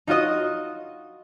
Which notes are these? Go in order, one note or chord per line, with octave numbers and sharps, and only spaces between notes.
D#4 F4 F#4 D#5